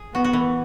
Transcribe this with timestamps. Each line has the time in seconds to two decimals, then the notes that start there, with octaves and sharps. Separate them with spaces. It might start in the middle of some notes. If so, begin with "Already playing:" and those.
Already playing: G#4
0.14 B3 F#4
0.24 F#4
0.33 E3